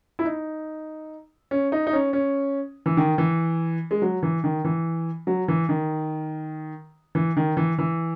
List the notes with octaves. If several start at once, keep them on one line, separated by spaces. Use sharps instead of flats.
E4
D#4
C#4
D#4
D#4
C#4
C#4
E3
D#3
E3
G#3
F#3
E3
D#3
E3
F#3
E3
D#3
E3
D#3
E3
E3